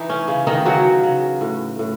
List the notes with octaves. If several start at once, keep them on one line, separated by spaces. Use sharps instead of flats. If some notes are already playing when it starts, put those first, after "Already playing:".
Already playing: E3 D#4
C#4
C#3
D#3 D#4
C#3 F#3 F#4
C#3
A2
A2